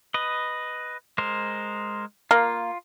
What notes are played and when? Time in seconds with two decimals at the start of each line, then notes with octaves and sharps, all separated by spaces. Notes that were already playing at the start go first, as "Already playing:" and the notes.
0.14 B4 D#5
1.18 G#3 A#4 C5
2.31 A#3 F4